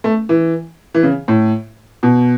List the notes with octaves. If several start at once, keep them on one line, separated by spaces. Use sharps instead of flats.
A3
E3
E3
C#3
A2
B2